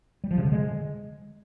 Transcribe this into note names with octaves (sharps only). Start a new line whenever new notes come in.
G3
F3
C3
D3
G#3